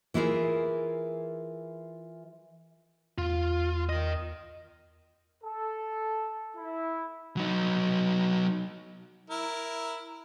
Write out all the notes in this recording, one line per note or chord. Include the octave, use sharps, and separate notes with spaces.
E3 E4 F4 G#4 A#4
E2 F4
A#4 D#5
A4
E4
F#3 D#4
E4 A#4